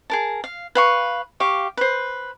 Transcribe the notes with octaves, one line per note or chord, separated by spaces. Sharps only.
G#4 A#4 A5
F5
B4 F5 C#6
G4 F5 C#6
B4 C5